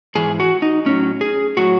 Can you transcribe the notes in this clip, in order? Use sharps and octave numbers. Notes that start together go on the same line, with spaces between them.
G#2 E3 G#4
F#4
D#4
A2 F#3 C#4
G#4
A2 F#3 F#4